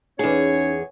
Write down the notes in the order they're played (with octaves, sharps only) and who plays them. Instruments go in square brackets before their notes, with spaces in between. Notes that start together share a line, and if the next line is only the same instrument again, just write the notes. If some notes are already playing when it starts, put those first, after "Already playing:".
[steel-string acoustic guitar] E2 G#4 [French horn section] C#4 D#4 [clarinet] C#5